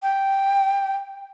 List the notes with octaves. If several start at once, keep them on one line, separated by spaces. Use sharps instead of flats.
G5